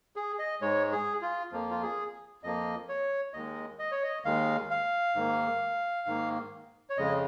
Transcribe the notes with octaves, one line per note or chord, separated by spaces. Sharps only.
G#4
D#5
G#2 G#3 C#5
G#4
F4
F2 F3 A#3
F4
G#4
F2 F3 A#3 D#5
C#5
D#2 D#3 G#3 D#5
D#5
C#5
D#5
D#2 D#3 G#3 F5
F5
G#2 D#3 A#3
G#2 D#3 A#3
C#5
F2 C#3 G#3 D#5